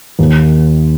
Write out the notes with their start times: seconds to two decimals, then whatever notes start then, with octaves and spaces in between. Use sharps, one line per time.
0.19 D#2